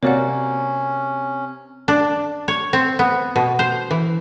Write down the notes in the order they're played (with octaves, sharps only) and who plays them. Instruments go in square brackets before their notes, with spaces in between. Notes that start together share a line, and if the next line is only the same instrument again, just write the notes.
[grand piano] C3 [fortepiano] A#3 F#4 [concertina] C#4 [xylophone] C#5 D5 F#5
[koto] D4
C#5
C4
B3
B2
C5
E3